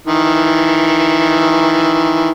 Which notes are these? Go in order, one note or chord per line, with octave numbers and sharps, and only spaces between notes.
D#3 E3